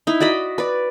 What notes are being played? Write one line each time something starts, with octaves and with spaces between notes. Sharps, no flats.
D#4 E4
F#4 D5 D#5 B5
B4 D5